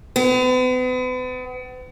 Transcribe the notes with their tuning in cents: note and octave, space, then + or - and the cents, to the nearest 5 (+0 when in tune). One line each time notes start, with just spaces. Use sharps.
B3 +40